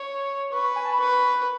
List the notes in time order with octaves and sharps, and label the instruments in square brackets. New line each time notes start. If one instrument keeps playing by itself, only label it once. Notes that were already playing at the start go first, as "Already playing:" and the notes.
Already playing: [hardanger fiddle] C#5 [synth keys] C#6
[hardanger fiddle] B4 [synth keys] C#6
[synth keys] G#5
A5
B5
[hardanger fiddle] B4 [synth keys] C#6